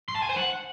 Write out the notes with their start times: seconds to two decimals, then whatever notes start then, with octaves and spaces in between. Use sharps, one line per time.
0.08 C6
0.15 A5
0.22 G#5
0.29 C5
0.36 F#5